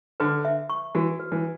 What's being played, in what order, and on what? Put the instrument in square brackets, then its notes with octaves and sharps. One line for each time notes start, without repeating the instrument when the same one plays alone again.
[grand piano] D3 [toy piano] B4
[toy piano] E5
C#6
[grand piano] E3 [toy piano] F#4
[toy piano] B4
[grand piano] E3